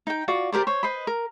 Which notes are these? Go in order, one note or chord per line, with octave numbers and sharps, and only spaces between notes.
D#4 G5
F4 F#4 D5
G4 A#4 C5 D5
C5 C#5
B4 C5 D#5 B5
A#4